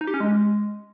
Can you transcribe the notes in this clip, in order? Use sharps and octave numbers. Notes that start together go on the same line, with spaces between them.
D#4
G4
C#4
G#3